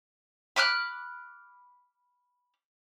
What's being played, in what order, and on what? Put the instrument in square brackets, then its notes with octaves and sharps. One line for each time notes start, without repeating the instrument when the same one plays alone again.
[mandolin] B5 D6 F6 F#6